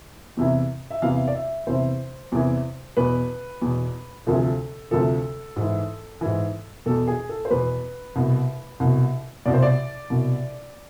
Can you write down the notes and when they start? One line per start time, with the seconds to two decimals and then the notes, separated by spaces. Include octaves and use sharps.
0.37 E2 C3 E3
0.91 E5
1.02 E2 C3 E3 F5
1.28 D5
1.34 E5
1.67 E2 C3 E3 C5
2.32 E2 C3 E3
2.97 E2 B2 B4
3.62 E2 B2
4.26 D2 C3 F3 A4
4.34 G#4
4.42 A4
4.91 D2 C3 F3 A4
5.56 G#2 E3
6.21 G#2 E3
6.86 E2 B2 A4
7.08 G#4
7.29 A4
7.45 C5
7.50 E2 B2 B4
8.16 C2 B2
8.80 C2 B2
9.46 C2 B2 D5
9.54 C5
9.62 D5
10.10 C2 B2